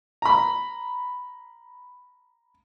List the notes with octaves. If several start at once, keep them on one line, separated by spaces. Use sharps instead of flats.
A#5 B5